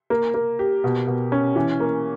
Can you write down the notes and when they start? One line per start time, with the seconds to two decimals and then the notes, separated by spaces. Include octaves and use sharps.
0.10 A#3
0.34 A#3
0.59 G4
0.84 B2
1.07 B2
1.32 C#4
1.56 E3
1.80 A#3